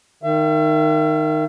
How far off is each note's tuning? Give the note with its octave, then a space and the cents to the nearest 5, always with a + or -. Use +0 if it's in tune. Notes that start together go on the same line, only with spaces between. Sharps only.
D#3 -10 E5 +40